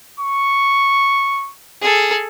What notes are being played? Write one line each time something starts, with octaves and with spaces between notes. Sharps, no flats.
C#6
G#4 A4